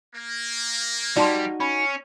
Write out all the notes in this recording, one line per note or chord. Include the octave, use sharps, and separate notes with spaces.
A#3
G3 D#4 F#4 D5 A5 C6
C#4 B5